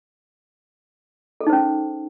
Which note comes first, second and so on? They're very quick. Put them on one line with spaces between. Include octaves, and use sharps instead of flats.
A4 G#4 D#4 C5 C#4